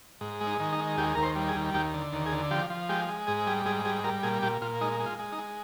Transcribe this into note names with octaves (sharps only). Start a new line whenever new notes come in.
G#2
G#3
D#4
D#3
D#4
G#3
D#2 G4
D#2 A#4
C5
G3
G#4
D#2
D#2 G4
D3
D#2
G#4
D3
F3 G4
F3
G#3 G4
G#3
G#2 G#4
G3 G#4
G#2 G#4
G3 G#4
G3 A#4
A#2 G#4
A#2 G4
A#2 F4
G#3 D#4
G#3
F4
G#3
D#4
G#3